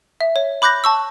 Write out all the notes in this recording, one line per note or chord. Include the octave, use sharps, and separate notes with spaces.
E5
C#5
B5 D6 F#6 G6 A#6
A5 C#6 E6